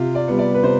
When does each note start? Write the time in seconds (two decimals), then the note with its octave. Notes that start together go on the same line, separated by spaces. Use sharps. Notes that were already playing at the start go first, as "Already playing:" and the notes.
Already playing: C3 F4
0.15 D5
0.28 G3 B3
0.39 D5
0.54 B4
0.63 C3 C5